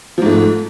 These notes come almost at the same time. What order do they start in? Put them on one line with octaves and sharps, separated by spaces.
F3 G#2 A3